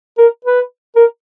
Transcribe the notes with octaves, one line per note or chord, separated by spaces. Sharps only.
A#4
B4
A#4